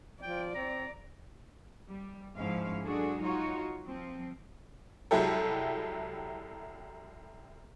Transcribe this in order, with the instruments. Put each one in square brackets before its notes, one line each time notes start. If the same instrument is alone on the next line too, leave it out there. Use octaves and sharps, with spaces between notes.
[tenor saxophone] F3 [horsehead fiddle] D5 [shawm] G5
[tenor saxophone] C4 [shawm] A#5
[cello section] G3
G#2 F3 G#3 C#4 E4 F5
F#3 G#3 D4 F#4 G#4 A4
D#4 F4 F#4 C#5
F3 C4
[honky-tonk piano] C2 F#3 G#3 E4 G4 A4